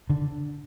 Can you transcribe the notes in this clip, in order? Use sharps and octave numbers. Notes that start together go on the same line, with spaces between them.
D3